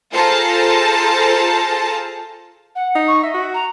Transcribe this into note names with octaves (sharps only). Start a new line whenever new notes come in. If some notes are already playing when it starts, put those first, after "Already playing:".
F4 G#4 A4 C5 A5 A#5
F#5
D#4
C#6
D#5 E5
F#4
A#5